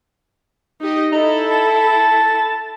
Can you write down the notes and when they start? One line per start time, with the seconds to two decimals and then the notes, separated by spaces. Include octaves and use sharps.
0.81 D#4 G4 D#5
1.12 D#4 E4 A4
1.51 A5